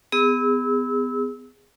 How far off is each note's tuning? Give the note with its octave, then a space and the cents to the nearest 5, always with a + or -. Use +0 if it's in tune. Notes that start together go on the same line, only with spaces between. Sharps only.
B3 +25 G#4 -30 E6 -25